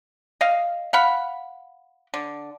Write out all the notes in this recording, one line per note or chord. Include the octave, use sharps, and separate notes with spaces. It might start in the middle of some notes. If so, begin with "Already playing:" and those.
D#5 F5
F5 F#5 B5
D3